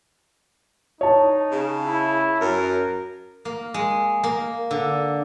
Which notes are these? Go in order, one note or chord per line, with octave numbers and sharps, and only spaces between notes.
D#4 C#5 A5
C#3
E4
F#2 A#4
A#3
G#3
A#3
D3